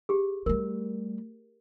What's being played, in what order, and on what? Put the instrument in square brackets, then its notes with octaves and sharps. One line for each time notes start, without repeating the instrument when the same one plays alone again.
[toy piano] G4 G#4
[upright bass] G3 A3 [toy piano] A#4